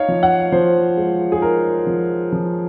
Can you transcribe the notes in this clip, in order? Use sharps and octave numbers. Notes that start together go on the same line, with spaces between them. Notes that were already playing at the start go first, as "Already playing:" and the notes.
Already playing: D#4 C#5 F5
F3
F#5
F3 C5
G#3
G#4
D#4 A#4
F3
F3